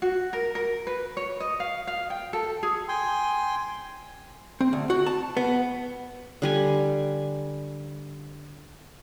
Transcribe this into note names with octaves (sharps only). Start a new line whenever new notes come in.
F#4
A#4
A#4
B4
C#5
D#5
F5
F5
G5
A4
G#4
G5 G#5 C6
C4
D2
F#4
A5
B3
D3 G3 G#5